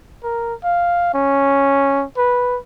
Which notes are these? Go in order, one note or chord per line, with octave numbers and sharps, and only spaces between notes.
A#4
F5
C#4
B4